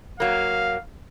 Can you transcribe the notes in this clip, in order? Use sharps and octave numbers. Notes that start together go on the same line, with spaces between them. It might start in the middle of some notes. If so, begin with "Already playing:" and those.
F#3 A#3 F5